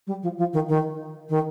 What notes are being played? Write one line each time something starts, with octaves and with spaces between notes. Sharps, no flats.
G3
F3
F3
D#3
D#3
D#3